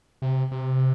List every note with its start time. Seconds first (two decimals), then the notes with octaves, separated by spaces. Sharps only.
0.22 C3
0.52 C3